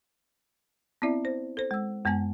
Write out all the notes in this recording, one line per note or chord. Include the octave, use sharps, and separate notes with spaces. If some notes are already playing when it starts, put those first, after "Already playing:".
B3 C4 E4 D5 E5
C5
A4 C5
G#3 E6
F#2 G#3 B3 G#5 G#6